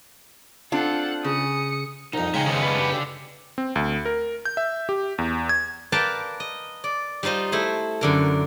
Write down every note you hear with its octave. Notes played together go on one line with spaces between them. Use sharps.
C4 D4 F4 A4 F#5
C#3 D#6 C#7
C2 F2 D#4
C#3 G#3 C#4 E5 G5
D#3 B3 G#4 B4 C5
D4 B4
G4
D3
C4
D2
A#4
G6
E5
G4
E2
G#6
A#4 B4 D5 F5 G5 A5
D#5
D5
G3 D#4 F4 C5 D#5
A3 E4 C5
F#2 D3 A#4